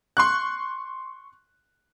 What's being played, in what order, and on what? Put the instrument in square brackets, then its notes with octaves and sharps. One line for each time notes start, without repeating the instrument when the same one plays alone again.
[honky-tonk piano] C6 C#6 F#6